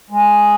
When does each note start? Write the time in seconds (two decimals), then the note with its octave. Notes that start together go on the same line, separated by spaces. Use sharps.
0.10 G#3